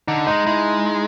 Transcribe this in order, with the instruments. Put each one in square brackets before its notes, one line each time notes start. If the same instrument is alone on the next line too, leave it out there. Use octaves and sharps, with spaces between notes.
[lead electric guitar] D3 [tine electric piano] D#4
[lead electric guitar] G#3 [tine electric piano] D#4
[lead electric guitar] G#3 [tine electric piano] E4